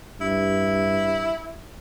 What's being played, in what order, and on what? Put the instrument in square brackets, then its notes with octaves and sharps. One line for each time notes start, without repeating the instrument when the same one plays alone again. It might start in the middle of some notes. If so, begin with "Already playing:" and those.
[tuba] G2 [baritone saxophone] E4